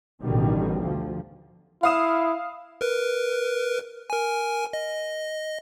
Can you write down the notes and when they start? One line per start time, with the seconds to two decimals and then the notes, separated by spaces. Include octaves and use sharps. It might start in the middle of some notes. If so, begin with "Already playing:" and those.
0.21 A1 B2 D3 D#3 G3
0.81 D2 F3
1.83 E4 F5 D#6 E7
2.81 A#4 B4
4.10 A#4 G#5
4.73 D#5